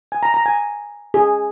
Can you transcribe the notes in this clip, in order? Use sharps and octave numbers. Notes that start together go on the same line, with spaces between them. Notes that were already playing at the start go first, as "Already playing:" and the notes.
G#5
A#5
A#5
G#5
G#4